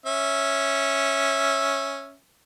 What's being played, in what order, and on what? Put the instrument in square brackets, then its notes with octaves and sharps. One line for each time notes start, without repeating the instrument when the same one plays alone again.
[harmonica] C#4 E5